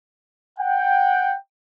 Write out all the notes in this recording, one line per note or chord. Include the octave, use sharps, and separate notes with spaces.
F#5 G5